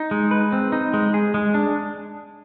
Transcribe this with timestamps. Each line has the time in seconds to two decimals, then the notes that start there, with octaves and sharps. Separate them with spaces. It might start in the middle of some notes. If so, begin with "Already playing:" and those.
Already playing: D#4
0.11 G#3
0.31 B4
0.52 C4
0.72 D#4
0.94 G#3
1.14 G#4
1.34 G#3
1.54 D4